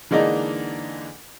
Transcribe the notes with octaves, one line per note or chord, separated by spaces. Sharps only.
D3 E3 G#3 A#3 D4 D#4